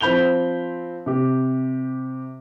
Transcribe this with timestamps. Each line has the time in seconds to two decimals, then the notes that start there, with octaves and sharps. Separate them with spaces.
0.01 F3 C4 B5 G6 F7 G7
1.06 C3 G4